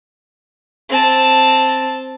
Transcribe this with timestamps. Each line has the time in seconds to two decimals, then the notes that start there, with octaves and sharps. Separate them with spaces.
0.89 C4 A5